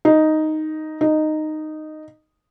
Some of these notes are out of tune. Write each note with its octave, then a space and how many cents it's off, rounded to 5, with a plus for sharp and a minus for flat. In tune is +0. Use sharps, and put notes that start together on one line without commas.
D#4 +0
D#4 -10